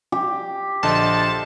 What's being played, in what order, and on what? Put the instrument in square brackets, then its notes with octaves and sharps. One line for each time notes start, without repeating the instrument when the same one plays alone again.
[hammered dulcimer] G4
[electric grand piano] A#1 D3 D#5 [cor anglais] C5 [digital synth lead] A5